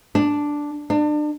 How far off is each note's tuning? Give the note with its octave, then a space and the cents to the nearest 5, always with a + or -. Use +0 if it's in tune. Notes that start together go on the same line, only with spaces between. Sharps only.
D4 +0
D4 +35